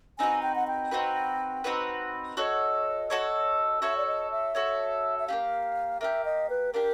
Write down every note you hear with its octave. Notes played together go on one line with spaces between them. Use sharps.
C4 D#4 F#4 B4 G#5
G5
F#5
G5
C4 D#4 F#4 B4
C4 D#4 F#4 B4
F#4 A4 C#5 D#5
F#4 A4 C#5
F#4 A4 C#5 E5
D5
D#5
E5
F#4 A4 C#5
E5
A#3 D4 G4 F5
A#3 D4 G4 E5
D#5
B4
A#3 D4 G4 A#4